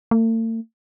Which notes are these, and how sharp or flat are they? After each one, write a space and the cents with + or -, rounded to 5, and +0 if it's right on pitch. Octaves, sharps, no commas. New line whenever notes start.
A3 +45